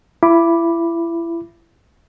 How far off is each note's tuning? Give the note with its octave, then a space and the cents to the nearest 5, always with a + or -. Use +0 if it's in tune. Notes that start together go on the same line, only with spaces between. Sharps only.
E4 +30 B5 +0 D6 +0